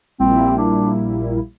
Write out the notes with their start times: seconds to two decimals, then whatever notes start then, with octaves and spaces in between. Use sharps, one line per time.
0.19 A#1 A#2 G3 A#3 C4 E4
0.58 D4